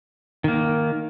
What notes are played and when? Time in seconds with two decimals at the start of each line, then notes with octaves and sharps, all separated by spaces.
0.44 D#3 A#3